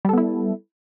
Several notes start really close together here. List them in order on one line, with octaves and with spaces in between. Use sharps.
G3 A4 B3 E4